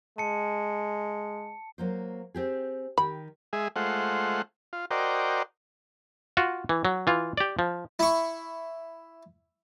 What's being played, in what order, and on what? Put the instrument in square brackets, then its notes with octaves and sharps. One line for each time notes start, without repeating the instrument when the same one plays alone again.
[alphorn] G#3 [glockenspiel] A5 C#7
[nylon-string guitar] F#3 A#3 C5
C4 G4 G#4
[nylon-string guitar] D#3 G4 [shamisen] B5
[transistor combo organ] G#3 G#4 E5
G#3 A3 F4 C5 F#5
F4
F#4 A#4 C5 D5 D#5 G5
[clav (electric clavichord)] F4 F#4
E3
F#3
E3 F4
G4 D5
F3
[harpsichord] E4 C#6